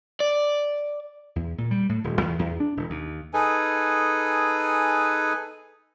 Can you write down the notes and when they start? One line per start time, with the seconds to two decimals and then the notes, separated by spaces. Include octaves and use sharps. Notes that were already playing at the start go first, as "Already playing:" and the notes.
0.20 D5
1.36 E2
1.58 A#2
1.71 G3
1.89 A2
2.04 D#1
2.21 E2
2.39 E2
2.60 D4
2.77 E1
2.90 D#2
3.34 D#4 G#4 A4 B4 G#5